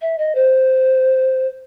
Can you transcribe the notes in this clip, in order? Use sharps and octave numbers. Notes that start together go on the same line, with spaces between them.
E5
D#5
C5